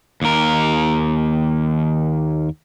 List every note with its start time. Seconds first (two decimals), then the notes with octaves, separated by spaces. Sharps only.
0.22 D#2 A#4